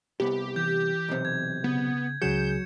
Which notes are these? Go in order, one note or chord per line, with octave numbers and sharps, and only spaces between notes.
C2 B3 G4
E3 G6
B1 C3
G#6
C#3 B3
C#2 C#3 F#3 G#4 G6 C#7 E7